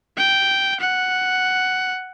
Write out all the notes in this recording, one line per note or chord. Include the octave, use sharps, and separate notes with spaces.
G5
F#5